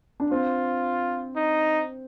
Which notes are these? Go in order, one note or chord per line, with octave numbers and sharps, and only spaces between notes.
D4
C4 F4
D#4